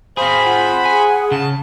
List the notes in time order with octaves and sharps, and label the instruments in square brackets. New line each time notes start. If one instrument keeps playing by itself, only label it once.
[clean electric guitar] C4 G#4 [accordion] C5 B5 [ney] F5
[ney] F4 [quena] F#5
[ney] G#4 [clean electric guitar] G#5
[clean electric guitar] C#3 [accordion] A5